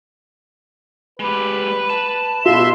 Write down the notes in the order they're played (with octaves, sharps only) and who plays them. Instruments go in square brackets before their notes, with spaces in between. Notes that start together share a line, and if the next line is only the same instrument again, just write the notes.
[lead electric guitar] G#3 G4 [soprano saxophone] B4
[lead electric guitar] A5
[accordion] B2 E5 C6 [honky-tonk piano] F4